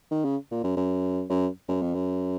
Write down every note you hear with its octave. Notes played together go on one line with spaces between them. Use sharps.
D#3
C#3
A#2
F#2
F#2
F#2
F#2
F2
F#2